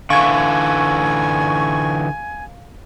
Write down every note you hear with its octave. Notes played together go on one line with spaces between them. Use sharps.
D3 E3 F5 G#5 C#6 G#6